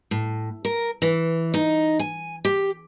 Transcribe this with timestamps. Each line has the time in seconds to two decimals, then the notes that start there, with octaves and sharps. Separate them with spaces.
0.11 A2
0.65 A#4
1.02 E3
1.54 D#4
2.00 G#5
2.45 G4